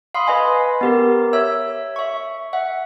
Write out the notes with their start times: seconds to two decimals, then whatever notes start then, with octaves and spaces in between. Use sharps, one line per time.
0.14 F5 B5 C6 D#6
0.27 B4 D#5 G#5 B5
0.81 B3 G4 A#4
1.33 C#5 E5 E6
1.96 E5 C#6
2.53 E5 F#5